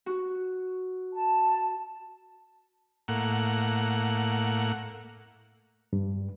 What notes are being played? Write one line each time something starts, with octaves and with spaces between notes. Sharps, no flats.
F#4
A5
A2 A#3 F#5
G2